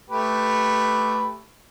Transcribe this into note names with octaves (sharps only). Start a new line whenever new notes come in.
A3 G4 B4